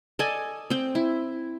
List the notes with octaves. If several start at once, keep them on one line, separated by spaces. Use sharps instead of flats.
A4 D5 D#5 G#5
C4 G5
E4